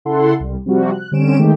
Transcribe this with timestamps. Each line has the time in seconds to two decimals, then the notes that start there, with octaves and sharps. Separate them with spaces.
0.05 C#3 E4 A4 F#5 C6
0.40 C2 G3
0.66 C3 F3 G3 F#4
0.92 F#6
1.12 D3 G3 C4 C#4 D7 E7
1.39 D#3 G#3 A3 G4